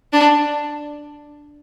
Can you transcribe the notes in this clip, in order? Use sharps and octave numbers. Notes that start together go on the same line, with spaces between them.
D4